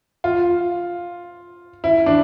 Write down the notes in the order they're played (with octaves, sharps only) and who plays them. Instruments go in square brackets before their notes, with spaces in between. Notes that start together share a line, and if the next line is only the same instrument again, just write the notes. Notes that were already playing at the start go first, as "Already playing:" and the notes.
[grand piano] F4
E4
D4